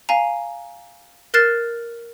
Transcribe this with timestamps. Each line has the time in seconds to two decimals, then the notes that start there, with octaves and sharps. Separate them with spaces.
0.09 F5 G#5 A#5
1.34 A#4 F6 F#6 A6 C7 E7